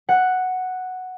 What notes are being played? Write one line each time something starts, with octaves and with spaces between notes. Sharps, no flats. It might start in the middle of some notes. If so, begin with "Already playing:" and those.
F#5